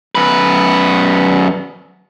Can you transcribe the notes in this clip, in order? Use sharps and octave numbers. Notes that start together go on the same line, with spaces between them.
F#2 B4